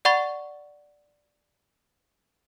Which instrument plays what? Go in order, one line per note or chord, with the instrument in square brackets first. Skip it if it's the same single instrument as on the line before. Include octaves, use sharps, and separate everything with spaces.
[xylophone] D5 F#5 B5 C#6 A6